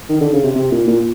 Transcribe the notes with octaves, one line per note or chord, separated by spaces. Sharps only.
D#3
D3
C#3
C3
C3
A#2
A#2